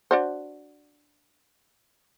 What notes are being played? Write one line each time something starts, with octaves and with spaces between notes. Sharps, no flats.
D4 F#4 C5